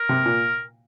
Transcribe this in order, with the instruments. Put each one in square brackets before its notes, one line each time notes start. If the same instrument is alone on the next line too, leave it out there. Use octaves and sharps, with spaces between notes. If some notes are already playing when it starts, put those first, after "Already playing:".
Already playing: [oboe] A#4
[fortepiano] C3
A#2